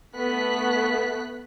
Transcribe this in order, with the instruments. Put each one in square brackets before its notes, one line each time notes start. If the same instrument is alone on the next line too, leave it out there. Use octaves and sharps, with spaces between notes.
[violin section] A3 B3 F#6 B6